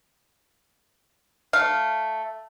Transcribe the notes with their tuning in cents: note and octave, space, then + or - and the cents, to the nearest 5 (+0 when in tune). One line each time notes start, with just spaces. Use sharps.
A3 +0 F5 +0